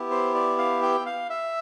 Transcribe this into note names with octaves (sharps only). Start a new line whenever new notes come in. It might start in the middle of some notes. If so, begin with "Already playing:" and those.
Already playing: B3 E4 G4
C5
D5
F5
G5
F5
E5